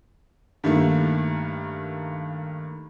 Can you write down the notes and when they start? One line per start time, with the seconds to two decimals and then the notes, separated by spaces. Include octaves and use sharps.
0.64 G2 D#3 G3 A3 A#3